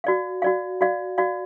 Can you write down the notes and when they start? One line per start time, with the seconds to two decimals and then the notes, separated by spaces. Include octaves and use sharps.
0.04 F#4 D5 F5
0.42 F#4 D5 F5
0.81 F#4 D5 F5
1.18 F#4 D5 F5